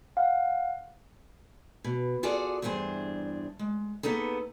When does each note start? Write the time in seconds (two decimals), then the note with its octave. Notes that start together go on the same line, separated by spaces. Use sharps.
0.17 F5 F#5
1.84 B2
2.23 F4 F#4 G#4 A4 D5
2.62 E2 G2 D4 G#4 C5
3.59 G#3
4.03 A#3 B3 D#4 G#4 A4